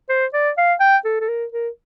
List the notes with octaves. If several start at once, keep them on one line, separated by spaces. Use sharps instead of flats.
C5
D5
F5
G5
A4
A4
A#4
A#4